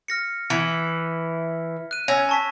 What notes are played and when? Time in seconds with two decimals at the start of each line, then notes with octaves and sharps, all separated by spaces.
0.08 F6 A#6 C#7
0.50 E3 G#6 B6 C#7
1.91 F#6 D#7
2.08 C#4 E6 G#6 A#6
2.29 A5 C#6 B6